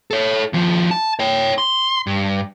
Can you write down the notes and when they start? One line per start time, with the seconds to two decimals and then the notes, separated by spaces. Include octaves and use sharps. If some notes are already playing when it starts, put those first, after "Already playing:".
0.11 A4 C#5
0.53 D#2 F3
0.91 A5
1.19 C#5 G5
1.58 C6
2.07 G2